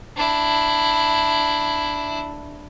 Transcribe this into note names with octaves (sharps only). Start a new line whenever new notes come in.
D4 E4